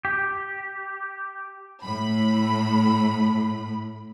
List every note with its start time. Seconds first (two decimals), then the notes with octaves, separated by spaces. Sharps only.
0.05 G4
1.83 A2 B5